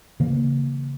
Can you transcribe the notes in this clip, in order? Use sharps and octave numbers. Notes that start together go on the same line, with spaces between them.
C#3 E3 A#3